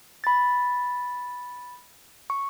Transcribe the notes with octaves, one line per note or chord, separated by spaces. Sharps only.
B5 A6
C#6